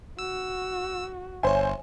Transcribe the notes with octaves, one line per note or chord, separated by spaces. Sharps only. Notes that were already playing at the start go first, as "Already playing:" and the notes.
F#4 E6
G1 C5 C#5 E5 G#5